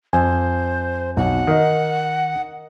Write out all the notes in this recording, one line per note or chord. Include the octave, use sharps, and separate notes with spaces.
F2 C5 G#5
B1 F#5
D#3 A#4 D#5